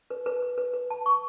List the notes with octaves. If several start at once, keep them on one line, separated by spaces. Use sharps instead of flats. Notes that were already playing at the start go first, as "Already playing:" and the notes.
B4
B4
B4
B4
B4
A5
C#6